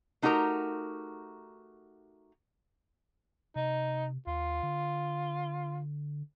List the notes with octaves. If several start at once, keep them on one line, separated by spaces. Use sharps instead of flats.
A3 D#4 F#4 G4 A#4 A#5
C3 D#4
D#2 F4
D3